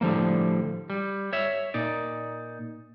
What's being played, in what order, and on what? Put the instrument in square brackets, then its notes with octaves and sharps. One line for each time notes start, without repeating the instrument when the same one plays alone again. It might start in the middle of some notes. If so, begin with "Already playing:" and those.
[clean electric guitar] A2 D3 F3 G3 A#3
G3
C#5 E5
A#2 D#4 D5